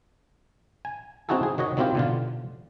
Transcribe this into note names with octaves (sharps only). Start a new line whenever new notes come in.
G#5
C4 D#4 E4 F#4 G#4 A4
G#4
D#3 F#4 C#5 D#5
D#3 F#3 C4 E4 F4 G4
B2 D3 F4